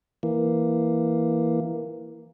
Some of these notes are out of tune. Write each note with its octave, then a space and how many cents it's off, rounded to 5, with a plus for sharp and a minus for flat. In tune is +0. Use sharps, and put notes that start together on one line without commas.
E3 +0 A#3 +0